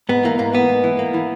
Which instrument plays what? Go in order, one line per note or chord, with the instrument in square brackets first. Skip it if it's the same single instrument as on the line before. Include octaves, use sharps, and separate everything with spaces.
[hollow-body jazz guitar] G#2 B3
E3 A#3
G#2 A#3
A#3 B3
G#2
E3
A#3
E3